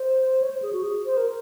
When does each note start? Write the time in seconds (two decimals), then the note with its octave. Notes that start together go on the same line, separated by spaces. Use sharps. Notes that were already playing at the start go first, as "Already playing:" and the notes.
Already playing: C5
0.42 C#5
0.51 C5
0.62 G#4
0.73 F#4
0.83 G#4
1.06 C5
1.17 A#4